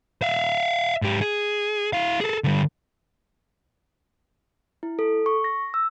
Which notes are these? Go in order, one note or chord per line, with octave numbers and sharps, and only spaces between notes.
E5 F5
G#2 G4
G#4
E4 F5
G#4 A4
D3 G3
E4
A4
C#6
A#6
E6